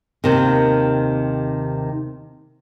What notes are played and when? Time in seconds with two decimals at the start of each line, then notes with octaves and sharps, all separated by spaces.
0.24 D#2 C3 D#3